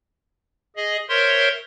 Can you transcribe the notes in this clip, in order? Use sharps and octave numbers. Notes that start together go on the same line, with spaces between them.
G#4 D#5
A#4 C5 C#5 E5 C6